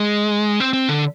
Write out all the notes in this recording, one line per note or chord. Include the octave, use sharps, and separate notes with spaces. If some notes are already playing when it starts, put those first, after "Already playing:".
Already playing: G#3
C4
C4
D3